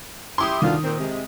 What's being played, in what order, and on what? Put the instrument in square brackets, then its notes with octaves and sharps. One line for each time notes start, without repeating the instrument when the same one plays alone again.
[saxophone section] E4 G4 [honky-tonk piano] C6 D6 D#6
[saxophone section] D2 D4 F4 [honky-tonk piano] D#3
[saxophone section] A#2 C4
C3 G#3